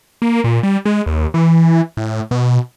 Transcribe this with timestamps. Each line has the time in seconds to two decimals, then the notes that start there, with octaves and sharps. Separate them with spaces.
0.22 A#3
0.44 A#2
0.63 G3
0.85 G#3
1.06 D#2
1.34 E3
1.97 A2
2.31 B2